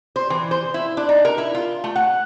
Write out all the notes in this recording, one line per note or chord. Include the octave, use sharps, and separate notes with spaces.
C5
E3
C5
E4
D4
D#4
A#4
E4
F4
A3
F#5